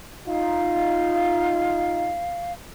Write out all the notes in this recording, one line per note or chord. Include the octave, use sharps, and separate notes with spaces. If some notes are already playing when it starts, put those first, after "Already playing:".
D#4 F4 F5